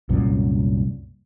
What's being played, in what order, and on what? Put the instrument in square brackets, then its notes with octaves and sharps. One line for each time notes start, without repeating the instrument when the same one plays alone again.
[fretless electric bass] C2 F#2 A#2